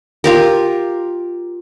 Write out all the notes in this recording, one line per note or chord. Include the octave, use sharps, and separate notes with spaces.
F4 G4 A#4